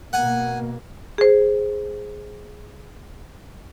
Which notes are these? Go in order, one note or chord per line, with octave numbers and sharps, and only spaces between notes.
B2 A#3 F#5 G#5
G#4 C5